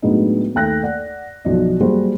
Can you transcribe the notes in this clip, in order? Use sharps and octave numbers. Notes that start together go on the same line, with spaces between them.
A2 F#3 G#3 B3 D4 D#4
D#2 A3 G5 F#6 A#6
D5 F#5
B1 F3 F#3 F4 D5 D#5
F#3 G3 A#3 F#4 G#4 C5